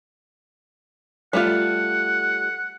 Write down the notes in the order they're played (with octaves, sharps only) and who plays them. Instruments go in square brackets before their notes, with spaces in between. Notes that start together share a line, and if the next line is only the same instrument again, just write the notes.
[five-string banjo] G3 A3 F4 [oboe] F#5